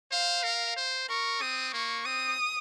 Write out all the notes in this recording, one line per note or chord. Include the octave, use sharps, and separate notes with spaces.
C5 F5
A#4
C5
A#4 C#6
C4 D#6
A#3 C#6
C4 D#6